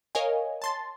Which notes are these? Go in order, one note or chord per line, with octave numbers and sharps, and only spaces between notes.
A#4 C#5 D#5 F5 G#5
A5 C6 A6